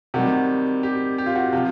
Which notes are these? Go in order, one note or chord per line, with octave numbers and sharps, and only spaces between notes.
C3 D#3 G3 F#4
G4
G4
F4
F#4
C3 F3 F4